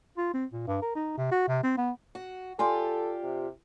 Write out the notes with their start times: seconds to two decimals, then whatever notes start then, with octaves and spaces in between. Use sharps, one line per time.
0.18 F4
0.34 C4
0.53 A#2
0.67 G2
0.82 A#4
0.96 D#4
1.17 C3
1.31 F#4
1.48 C3
1.63 C4
1.77 B3
2.15 F#4
2.59 F4 G4 A4 D5 G#5 C6
3.23 C3